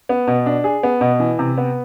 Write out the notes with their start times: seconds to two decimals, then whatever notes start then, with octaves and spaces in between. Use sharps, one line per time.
0.09 B3
0.27 B2
0.46 D4
0.64 G#4
0.83 B3
1.01 B2
1.20 E3
1.39 C3
1.58 B3